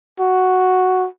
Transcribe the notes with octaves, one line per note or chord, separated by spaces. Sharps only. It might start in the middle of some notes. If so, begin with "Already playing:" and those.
F#4